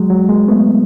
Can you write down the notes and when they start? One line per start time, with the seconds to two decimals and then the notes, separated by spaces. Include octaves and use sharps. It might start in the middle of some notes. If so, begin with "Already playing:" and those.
Already playing: F#3 G#3
0.10 F#3
0.29 G#3 A#3
0.48 A3 B3